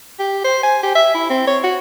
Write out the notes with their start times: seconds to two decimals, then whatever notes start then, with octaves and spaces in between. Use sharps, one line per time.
0.19 G4
0.44 C5
0.63 G#5
0.83 G4
0.95 E5
1.14 E4
1.30 C4
1.47 C#5
1.64 F#4